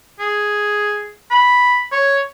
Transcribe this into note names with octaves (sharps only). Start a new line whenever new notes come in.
G#4
B5
C#5